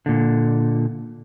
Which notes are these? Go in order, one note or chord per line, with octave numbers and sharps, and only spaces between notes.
A#2 D3